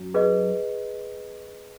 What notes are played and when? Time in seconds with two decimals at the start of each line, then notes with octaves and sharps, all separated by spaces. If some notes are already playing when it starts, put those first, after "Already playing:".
Already playing: F#2 F#3
0.14 G#4 B4 D#5